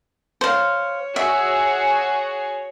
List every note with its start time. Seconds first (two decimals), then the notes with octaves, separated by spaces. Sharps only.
0.41 C5 C#5 F5
1.16 F#4 G#4 E5